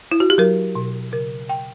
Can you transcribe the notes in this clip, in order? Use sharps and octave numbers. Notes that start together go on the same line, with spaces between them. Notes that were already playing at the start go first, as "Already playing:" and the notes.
E4
F#4
G4
F#3 A#4
B2
C#3 A#4
G5